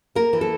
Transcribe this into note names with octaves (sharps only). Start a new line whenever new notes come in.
A#3 A#4
E3
A4